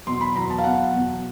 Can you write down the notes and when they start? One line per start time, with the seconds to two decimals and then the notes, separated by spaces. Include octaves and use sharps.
0.06 E2 B2 F#3 C6
0.21 B5
0.35 E2 B2 F#3 A#5
0.50 A5
0.58 F5
0.64 E2 B2 F#3 F#5
0.93 E2 B2 F#3